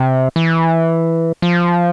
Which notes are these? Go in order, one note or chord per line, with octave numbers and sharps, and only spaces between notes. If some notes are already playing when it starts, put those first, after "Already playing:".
Already playing: C3
E3
F3